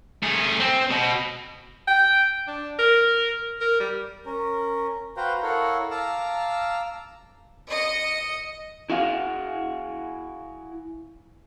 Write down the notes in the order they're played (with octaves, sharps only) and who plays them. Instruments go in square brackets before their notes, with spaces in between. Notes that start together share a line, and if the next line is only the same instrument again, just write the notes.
[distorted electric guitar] A3 G#4
C4
B2
[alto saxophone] G5
D4
A#4
A#4
G3
[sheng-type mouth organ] C#4 A#4
F#4 B4 C5 F5 G5 A#5
E4 A4 A#4 C#5 F5 F#5
F5 A5 A#5 D6 E6 F6
[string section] D#5 C#7
[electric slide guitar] E4 F#4 G#4 F5